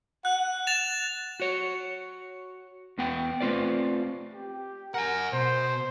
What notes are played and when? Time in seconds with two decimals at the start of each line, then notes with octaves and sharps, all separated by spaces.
0.25 F#5 F#6
0.67 A6 E7 F7
1.40 F#4 C#5
2.98 E2 B3 G5
3.40 A3 C4 F4 B4 D5
4.34 G4
4.94 A#4 F#5 G#5
5.33 B2 C5